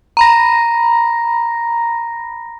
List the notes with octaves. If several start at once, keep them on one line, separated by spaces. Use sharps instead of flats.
A#5 B5 A#6